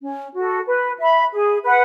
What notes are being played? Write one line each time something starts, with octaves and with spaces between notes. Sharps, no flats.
C#4
F#4 A4
B4
E5 B5
G#4
B4 F#5